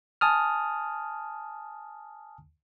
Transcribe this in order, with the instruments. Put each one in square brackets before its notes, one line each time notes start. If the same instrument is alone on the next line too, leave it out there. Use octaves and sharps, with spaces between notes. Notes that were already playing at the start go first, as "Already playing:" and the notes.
[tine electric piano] G#5 A5 D#6 F6